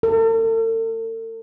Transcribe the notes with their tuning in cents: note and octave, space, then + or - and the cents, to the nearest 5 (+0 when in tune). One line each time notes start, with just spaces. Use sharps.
A4 +45